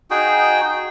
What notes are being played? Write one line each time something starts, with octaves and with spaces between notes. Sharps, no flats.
D#4 F#4 G#4 G5